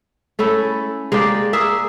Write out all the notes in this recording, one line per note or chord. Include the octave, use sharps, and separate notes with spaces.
A3 C#4 E4 A4
G#3 A#3 G4 D5
G#4 A#4 E5